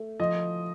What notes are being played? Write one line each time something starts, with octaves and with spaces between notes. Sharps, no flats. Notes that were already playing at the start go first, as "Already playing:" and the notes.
Already playing: A3
F3 D#5